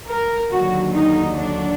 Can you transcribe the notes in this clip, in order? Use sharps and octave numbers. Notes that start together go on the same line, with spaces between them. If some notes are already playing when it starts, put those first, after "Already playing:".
A#4
D#2 D3 F#3 F#4
D#4
D4